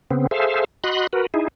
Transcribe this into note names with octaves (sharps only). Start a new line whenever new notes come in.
C#3 B3 C4
G#4 A4 C5 E5 F5
F#4 D#5 B5 C6 F#6
F#4 A#4 B4
D#4 E4 G#4